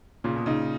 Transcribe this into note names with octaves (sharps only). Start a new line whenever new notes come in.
A#2 C#3
B2
C#3 D#4